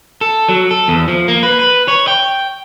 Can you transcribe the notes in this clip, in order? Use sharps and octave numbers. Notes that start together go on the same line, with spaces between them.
A4
F#3
A4
E2
F3
A#3
B4
B4
C#5
G5